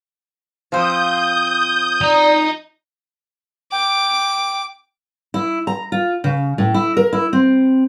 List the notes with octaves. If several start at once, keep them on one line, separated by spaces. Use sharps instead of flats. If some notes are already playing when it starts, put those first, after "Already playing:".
F3 C4 C5 D#6 G6
D5 D#5 A#5
G5 D6
E4
A#5
F4
C#3
A2
E4
A#4
E4
C4